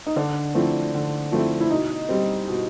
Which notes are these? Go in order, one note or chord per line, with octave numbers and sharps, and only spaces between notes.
D#4
D3 D4
F3 A3 C4 E4
D3
F3 A3 C4 E4
E4
B2 D#4
G3 C4
B2